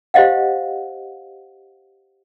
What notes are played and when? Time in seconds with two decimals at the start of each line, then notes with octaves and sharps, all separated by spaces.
0.14 G4 C5 D#5 F5 F#5